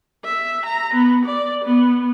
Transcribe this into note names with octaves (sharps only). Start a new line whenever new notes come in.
E5
A#5
B3
D5
B3